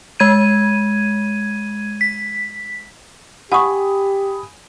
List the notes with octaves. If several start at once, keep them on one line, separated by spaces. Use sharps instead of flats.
G#3 G#6 D#7
B6
G4 F#5 G#5 B5 C#6 D#6